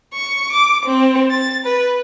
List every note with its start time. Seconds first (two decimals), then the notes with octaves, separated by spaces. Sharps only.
0.14 C#6
0.53 D6
0.85 C4
1.31 A6
1.64 B4